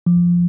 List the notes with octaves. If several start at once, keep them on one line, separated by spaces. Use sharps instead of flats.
F3